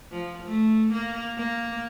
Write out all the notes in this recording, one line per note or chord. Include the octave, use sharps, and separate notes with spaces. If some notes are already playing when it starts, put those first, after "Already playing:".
F3
A3
A#3
A#3